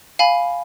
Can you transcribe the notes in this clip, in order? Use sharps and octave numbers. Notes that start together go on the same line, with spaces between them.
F5 G#5 B5